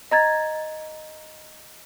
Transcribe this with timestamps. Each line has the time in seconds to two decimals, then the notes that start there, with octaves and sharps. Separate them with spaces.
0.11 D#5 A#5 G#6 A6